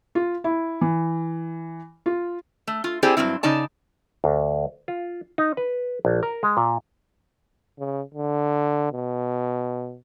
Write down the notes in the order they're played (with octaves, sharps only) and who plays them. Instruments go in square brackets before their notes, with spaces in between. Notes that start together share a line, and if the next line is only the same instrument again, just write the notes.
[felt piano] F4
E4
E3
F4
[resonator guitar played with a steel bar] A3
F4
C4 E4 G4 G#4 C5 D5
G2 A#2 F#3 C4 E4
C#3 D#4 D5 A5
[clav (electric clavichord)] D2
F4
D#4
B4
A#1
A#4
G#3
A#2
[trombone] C#3
D3
B2